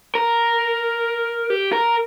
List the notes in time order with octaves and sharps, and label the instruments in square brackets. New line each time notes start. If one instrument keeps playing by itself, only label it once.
[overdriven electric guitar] A#4
G4
A#4